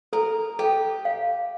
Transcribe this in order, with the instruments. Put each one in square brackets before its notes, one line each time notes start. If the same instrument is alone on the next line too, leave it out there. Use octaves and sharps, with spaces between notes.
[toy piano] A4 [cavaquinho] A#4
[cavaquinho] G4 [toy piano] A4
[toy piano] F5